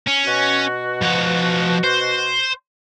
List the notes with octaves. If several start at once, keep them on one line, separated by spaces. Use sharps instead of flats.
C#4
B2 F#4
F3 F#5
C5